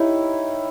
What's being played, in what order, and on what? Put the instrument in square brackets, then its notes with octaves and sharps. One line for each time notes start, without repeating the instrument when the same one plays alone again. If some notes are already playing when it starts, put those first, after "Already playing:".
Already playing: [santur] D#4 G4 A#4 C#5 [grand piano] E4